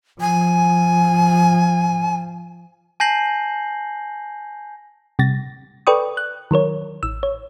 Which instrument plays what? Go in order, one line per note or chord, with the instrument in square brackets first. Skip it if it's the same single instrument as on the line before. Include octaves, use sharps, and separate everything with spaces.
[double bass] F3 [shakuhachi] G#5
[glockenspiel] G#5 A5 G6 A#6 C7 F#7
[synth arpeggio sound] C3 G3 A6 A#6
A4 B4 D5 G5 C#6 D#6
F#6
D#3 F#3 A#4 C#5
A1 E6
C#5